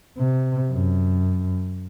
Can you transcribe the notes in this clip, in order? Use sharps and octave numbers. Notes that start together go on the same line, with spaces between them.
C3
F#2